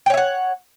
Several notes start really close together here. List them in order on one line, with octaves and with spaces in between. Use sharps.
G5 C#5 E5 F#5